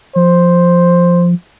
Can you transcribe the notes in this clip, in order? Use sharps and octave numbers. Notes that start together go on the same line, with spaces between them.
F3 C5